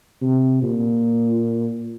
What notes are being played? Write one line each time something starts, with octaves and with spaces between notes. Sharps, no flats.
C3
A#2